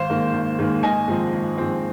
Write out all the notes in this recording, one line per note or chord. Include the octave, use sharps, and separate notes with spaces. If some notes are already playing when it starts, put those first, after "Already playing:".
Already playing: G#1 C5 F5
G#2 D#3 A#3
G#1
G#2 D#3 A#3
G#1 D#5 G#5
G#2 F3 C4
G#1
G#2 F3 C4